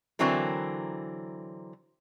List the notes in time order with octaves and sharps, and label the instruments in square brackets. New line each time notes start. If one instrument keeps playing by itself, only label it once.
[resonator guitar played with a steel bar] D3 E3 F#3 C4 E4 A#4